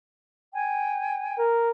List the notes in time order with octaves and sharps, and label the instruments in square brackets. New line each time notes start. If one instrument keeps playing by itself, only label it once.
[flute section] G5 G#5
[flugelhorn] A#4